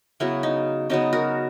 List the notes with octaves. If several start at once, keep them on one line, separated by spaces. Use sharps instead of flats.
C#3 F#3 B3 C#4 E4
D#4
C#3 F#3 B3 D#4
F#4 A#4